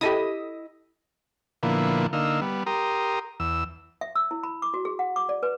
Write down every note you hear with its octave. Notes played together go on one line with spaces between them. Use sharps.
E4 G4 A4 D#5 D#6
A#2 D3 F3 A#3 B3 E4
D3 A#3 D#4 F5 E6
G3 B3
G4 A#4 A#5 C6 D#6
E2 E6
E5
E6
E4
B5
D6
F#4
G#4
F#5
D6
D5
B4